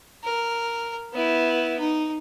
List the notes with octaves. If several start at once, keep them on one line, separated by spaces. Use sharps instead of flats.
A#4
B3 E4
D#4